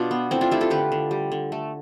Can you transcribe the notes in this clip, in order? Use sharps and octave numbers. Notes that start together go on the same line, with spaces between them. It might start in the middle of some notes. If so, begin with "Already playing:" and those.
Already playing: B2 D4 F4
B3
A3 C4 E4
D4 F4
A3 E4 G4
F4 A4
D3 G4 B4
D3
G3
D3
A3